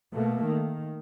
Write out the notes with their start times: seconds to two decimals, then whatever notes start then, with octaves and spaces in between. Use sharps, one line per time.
0.13 B2 A3 A#3
0.47 D#3